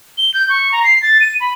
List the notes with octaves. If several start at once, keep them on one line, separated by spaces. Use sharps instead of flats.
G7
G6
C#6
A#5
C7
A6
D#7
B5